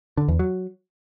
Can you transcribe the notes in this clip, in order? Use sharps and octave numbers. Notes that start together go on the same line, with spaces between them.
D3
E2
F#3